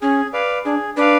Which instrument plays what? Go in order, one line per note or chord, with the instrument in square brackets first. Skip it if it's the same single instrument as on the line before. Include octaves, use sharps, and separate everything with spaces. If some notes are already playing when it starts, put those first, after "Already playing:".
[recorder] C#4 [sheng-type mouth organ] G#4
[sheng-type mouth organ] B4 D5 F5
[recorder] D4 [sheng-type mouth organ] G#4
[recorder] D4 [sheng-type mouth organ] B4 D5 F5